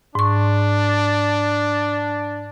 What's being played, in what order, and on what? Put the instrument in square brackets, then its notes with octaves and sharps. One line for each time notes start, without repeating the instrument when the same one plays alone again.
[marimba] G#2 C#6 [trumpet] D4